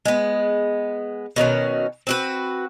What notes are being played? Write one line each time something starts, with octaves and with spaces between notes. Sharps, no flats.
G#3 B3
B2 D#3 F#3 C#4
C4 F#4 B4